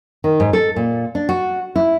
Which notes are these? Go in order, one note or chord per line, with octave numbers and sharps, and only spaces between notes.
D#3
G#2
A4
A#2
D4
F#4
E4